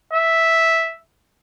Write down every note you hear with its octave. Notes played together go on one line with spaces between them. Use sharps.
E5